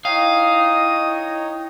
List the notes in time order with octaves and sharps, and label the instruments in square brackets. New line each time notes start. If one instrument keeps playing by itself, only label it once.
[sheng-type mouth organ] D#4 C#5 D#5 [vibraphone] E4 G5 [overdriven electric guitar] F5 [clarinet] D#6